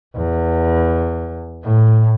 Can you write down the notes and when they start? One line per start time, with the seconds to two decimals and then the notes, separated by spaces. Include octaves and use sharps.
0.16 E2
1.64 A2